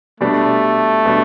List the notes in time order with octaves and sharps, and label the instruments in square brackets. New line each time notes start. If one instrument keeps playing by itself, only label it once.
[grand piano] B2 G3 D4 [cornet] A3
[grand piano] B2 G3 D4